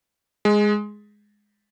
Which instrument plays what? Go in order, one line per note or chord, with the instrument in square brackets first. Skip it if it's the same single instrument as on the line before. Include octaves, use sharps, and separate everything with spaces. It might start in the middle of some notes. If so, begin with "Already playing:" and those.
[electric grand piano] G#3